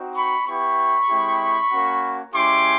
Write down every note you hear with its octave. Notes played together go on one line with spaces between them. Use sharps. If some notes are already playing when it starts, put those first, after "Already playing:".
Already playing: C4 D#4 F#4
B5 C#6
B3 E4 G4 B5 C#6
G#3 C4 E4 G4
A#3 C#4 F#4
G#3 C#4 E4 G4 C6 D6